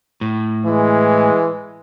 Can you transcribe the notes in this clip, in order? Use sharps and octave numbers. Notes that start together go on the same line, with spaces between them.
A2
E3 G#3